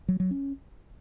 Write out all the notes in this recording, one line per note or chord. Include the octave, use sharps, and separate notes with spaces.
F#3
F#3
C#4